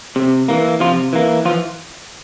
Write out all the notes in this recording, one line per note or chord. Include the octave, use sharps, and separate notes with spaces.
C3
E3 A#3
C3 F3 F4
E3 A#3
E3 F3 F4